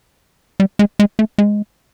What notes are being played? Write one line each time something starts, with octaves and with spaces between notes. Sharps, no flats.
G3
G#3
G#3
A3
G#3